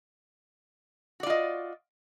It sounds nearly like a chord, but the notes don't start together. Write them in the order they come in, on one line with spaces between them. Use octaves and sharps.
F#4 D5 F4 D#5